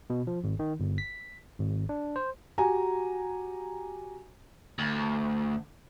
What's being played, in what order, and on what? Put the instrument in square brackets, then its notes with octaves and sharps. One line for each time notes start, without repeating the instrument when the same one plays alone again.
[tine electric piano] B2
F3
G#1
D#3
G1
B6
G#1
D4
C5
[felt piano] F#4 G4 G#5 A#5
[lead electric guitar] D2